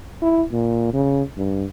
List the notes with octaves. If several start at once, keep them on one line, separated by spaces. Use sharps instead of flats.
E4
A#2
C#3
G2